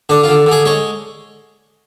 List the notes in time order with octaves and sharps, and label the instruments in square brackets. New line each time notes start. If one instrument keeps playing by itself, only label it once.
[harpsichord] D3 D4
F4
D3
D3
G#4
G#3 C#5